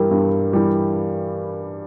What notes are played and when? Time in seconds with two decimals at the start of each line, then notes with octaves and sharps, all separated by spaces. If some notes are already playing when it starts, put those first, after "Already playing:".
Already playing: G2 E3 G3 A#4
0.11 G2
0.53 E3 G3